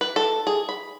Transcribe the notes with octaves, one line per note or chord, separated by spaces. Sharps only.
B4
A4
G#4
B5